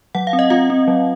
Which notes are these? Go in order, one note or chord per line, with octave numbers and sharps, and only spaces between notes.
F#3 F#5
F5
C4
D#5
C4 F4 F5
C4
F#3